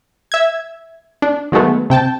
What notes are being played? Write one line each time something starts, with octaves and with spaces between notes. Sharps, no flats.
E5 G#6
D4
D#3 F#3 G#3 A3 B3
C3 G5 A5